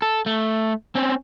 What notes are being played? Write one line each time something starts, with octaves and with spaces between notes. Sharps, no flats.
A4
A3
C4 C#4